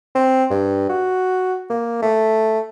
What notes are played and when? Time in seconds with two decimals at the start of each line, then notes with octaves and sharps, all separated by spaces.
0.15 C4
0.50 G2
0.89 F#4
1.70 A#3
2.02 A3